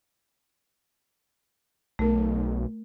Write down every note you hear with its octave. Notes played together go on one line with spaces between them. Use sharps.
B1 A3 A#4